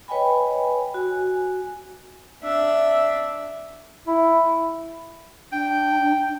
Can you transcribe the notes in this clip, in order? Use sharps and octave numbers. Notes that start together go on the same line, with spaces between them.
B4 C#5 D#5 G5 G#5 B5
F#4 G#5
D4 E5
E4
D4 G5